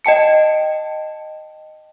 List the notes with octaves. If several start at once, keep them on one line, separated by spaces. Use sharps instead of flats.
D#5 G5 A5 C#7